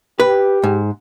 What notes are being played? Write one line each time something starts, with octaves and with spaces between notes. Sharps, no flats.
G4 B4
G#2